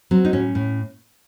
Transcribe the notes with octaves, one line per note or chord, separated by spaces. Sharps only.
F#3 C4
D#4
A2 C#4
A2